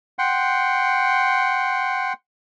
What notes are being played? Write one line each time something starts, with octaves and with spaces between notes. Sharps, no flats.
F#5 G5 C6